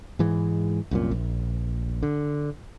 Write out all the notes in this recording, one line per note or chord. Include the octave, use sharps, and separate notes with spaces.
G#2 E3 G#3
C2 F#2 A#2
A#1
D3